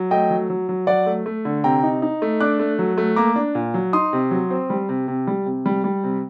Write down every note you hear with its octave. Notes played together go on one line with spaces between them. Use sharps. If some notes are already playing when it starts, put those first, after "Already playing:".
Already playing: F#3
A3 D#5 G5
F#3
F#3
F#3
F#3 D5 F#5
A3
A3
D3
C3 G5 A#5
D#4
D#4
A3
D4 D6 F#6
A3
F#3
A3
A#3 A#5 D6
D4
A#2
F#3
D#4 C6 D#6
C3
F#3
C4
G3
C3
C3
G3
C3
G3
G3
C3